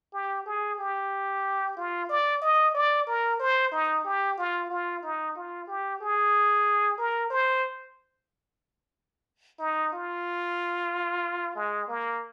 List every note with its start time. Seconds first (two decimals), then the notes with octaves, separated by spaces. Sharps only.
0.13 G4
0.46 G#4
0.79 G4
1.77 F4
2.09 D5
2.42 D#5
2.74 D5
3.07 A#4
3.40 C5
3.72 D#4
4.05 G4
4.38 F4
4.70 F4
5.02 D#4
5.36 F4
5.67 G4
6.01 G#4
6.98 A#4
7.31 C5
9.59 D#4
9.93 F4
11.55 G#3
11.88 A#3